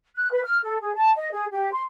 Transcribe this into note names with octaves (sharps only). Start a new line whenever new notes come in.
F#6
B4
F6
A4
G#4
A5
D#5
G#4
G4
C6